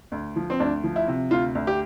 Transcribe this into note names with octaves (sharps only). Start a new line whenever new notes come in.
D2
F3
C4
D2 D4
F3
E4
C3
D2 F4
D2
G4